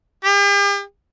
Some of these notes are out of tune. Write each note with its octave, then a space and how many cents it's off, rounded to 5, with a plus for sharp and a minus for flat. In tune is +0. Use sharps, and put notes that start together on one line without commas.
G4 +45